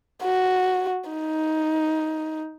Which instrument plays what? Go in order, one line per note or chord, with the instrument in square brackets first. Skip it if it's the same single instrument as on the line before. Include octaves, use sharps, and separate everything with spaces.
[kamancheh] F#4
D#4